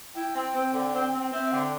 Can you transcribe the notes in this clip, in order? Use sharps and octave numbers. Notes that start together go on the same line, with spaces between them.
E4 G5
C4
C4
D3
C4
C4
C4 E5
D3 G5